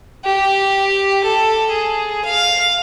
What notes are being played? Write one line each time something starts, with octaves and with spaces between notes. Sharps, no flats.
G4
A4
G#4
F5